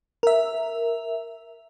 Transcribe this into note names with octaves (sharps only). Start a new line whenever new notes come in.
A#4 E5